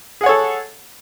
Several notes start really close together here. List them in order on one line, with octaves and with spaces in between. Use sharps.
G#4 F#5 C#5 A4